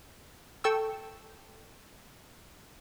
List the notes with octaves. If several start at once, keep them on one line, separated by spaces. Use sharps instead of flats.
A4 G5 C#6 E6